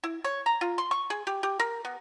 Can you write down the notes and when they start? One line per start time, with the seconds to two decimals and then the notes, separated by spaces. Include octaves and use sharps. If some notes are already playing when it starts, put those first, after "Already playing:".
0.04 E4
0.24 C#5
0.46 A#5
0.61 F4
0.78 C6
0.91 C#6
1.10 G#4
1.27 G4
1.43 G4
1.60 A#4
1.85 B3